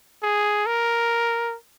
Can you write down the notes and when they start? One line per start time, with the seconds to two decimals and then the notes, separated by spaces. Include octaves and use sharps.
0.23 G#4
0.66 A#4